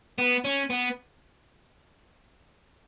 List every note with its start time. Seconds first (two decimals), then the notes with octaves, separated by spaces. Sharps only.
0.18 B3
0.44 C#4
0.70 B3